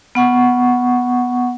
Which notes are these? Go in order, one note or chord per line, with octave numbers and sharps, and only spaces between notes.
B3 F#5 C#6